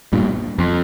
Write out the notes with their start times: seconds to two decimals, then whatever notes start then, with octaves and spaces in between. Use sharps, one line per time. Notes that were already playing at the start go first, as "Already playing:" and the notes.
0.13 G2 A#2
0.58 F2